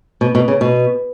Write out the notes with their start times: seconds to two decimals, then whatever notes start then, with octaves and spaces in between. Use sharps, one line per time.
0.21 B2
0.35 B2
0.48 C#3
0.61 B2